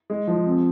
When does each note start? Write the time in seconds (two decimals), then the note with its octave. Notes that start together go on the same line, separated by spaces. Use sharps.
0.10 G#3
0.27 F3
0.45 C4